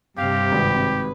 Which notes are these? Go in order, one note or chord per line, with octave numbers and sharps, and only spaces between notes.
G2 C3 G4 F5
G#1 B4